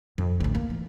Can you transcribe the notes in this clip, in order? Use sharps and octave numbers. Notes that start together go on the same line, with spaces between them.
F2
A1 D2
A#3
E3